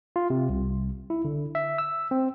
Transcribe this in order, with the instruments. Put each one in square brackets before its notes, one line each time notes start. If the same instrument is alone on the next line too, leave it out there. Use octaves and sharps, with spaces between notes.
[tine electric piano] F4
C3
C2
E4
D3
E5
E6
C4